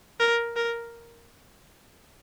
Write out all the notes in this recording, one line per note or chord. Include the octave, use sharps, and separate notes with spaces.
A#4
A#4